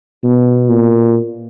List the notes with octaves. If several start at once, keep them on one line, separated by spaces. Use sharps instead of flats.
B2
A#2